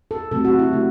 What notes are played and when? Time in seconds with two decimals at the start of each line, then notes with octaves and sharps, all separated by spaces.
0.11 A4
0.31 C3 F#3 A3 A4
0.45 F#4
0.59 E4
0.73 C3 F#3 A3